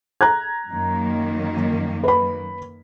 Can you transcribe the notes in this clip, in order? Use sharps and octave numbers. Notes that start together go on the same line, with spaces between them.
A#5 F#6 G#6
F#2 D#3 A#3
B4 B5